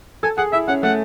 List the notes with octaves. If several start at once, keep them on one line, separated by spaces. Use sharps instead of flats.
A4 G#5
G#4 F#5
E4 E5
C#4 F#5
A3 F#5